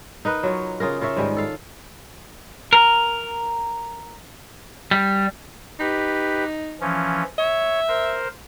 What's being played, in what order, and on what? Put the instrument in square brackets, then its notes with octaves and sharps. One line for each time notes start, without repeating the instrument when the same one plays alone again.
[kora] D#4 A#4 B4
F#3 F4 C#5
C#3 F4 G#4 A#4
F4 A#4 C#5 E5
G#2 D#3 G3 G#3
A4 F5
[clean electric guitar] A#4
G3
[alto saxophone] D#4 [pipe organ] G4 B4
[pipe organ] E3 F3 C#4
[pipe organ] C#5 [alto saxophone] E5
[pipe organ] A#4 C5